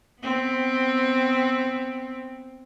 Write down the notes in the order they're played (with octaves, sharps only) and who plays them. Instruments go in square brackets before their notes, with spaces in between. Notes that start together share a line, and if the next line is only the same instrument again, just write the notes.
[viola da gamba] B3 C4